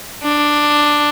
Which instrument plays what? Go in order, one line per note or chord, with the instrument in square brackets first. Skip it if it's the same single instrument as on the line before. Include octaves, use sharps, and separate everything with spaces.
[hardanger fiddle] D4